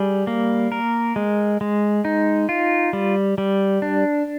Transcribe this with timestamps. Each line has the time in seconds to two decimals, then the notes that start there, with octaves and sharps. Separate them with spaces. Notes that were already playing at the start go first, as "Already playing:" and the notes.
Already playing: G3 G#4
0.27 A#3
0.72 A#4
1.16 G#3
1.61 G#3
2.05 D#4
2.49 F4
2.93 G3
3.38 G3
3.82 D4